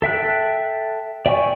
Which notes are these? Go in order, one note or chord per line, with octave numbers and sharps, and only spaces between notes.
A4 E5 G5 F#6
D5 E5 G5 G#5 C#6